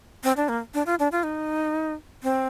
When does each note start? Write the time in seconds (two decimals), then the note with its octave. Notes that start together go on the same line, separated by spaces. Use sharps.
0.24 C4
0.37 D4
0.49 A#3
0.74 D4
0.86 F4
0.99 D4
1.12 F4
1.23 D#4
2.23 C4